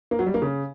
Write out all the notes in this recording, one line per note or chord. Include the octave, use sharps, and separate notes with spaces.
A#3
F#3
G3
A#3
C#3